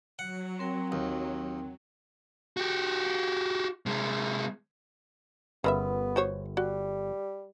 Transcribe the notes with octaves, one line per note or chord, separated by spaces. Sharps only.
F#3 F#5
C4 A#4 G5
D#2
F#4 G4
C3 G#3
G1 C#3 B3 D#4 A#4 B4 E5 B5
F#4 C5 C#5
G3 F#4